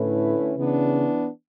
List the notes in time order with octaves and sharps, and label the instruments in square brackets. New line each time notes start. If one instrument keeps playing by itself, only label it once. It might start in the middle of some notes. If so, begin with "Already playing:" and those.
Already playing: [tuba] A2 [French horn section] D3 A3 C#4 E4 B4
[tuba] C#3 [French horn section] E3 B3 D4